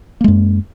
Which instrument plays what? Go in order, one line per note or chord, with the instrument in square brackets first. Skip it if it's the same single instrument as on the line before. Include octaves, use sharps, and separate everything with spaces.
[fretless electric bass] A#3
G#3
F#2